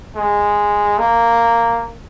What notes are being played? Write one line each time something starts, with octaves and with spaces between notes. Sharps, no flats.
G#3
A#3